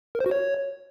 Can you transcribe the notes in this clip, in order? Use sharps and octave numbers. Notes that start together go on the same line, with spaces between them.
A#4
C5
F#4
C#5